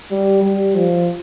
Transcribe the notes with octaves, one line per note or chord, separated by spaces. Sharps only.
G3
G3
F3